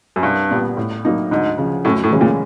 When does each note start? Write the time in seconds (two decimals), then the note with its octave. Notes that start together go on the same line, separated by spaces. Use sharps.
0.16 F#2
0.23 C2 G2
0.51 A#2 G3 B3
0.77 A2
1.05 F#3 A#3 D#4
1.31 D2 G#2
1.58 C#3 F3
1.85 F#2 A2
2.03 A2
2.12 C#3 E3 G#3 C#4
2.21 A#2